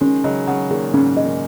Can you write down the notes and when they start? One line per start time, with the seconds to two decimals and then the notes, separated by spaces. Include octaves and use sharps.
0.01 D#3 G#3 C#4
0.24 C#3 F#3 D#5
0.47 C#3 F#3 F#5
0.71 A#2 D#3 G#4
0.93 G#2 C#3 C#4
1.17 D#5
1.25 A#2 D#3